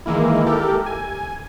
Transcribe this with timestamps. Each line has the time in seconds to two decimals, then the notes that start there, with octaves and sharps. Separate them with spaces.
0.06 D#3 E3 G#3 A#3 E4
0.46 G4 A4 A#4
0.86 G#5